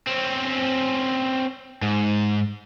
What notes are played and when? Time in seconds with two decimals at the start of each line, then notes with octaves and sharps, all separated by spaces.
0.07 C4 C#4
1.82 G#2